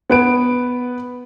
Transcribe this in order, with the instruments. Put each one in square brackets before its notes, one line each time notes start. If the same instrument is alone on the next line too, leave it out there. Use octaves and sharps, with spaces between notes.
[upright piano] B3 B4 D7